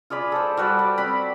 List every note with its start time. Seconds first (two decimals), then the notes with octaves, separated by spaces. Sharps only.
0.10 F4 G#4 D5 B5
0.32 A4 C5
0.57 G3 F#4 B4 D5
0.79 D5
0.98 C4 B5